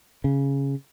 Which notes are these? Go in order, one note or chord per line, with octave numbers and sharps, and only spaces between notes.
C#3